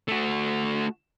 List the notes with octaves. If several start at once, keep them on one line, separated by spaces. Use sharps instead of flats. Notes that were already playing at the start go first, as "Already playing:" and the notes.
A3 F#4